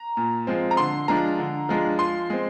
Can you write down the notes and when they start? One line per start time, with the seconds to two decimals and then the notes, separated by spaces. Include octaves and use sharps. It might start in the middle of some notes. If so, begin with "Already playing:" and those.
Already playing: A#5
0.17 A#2
0.47 F3 G#3 C4
0.71 A#5
0.77 D3 C6
1.08 F3 G#3 D4 A#5
1.39 D3
1.69 F3 G#3 D4
1.99 F3 C6
2.30 G#3 C4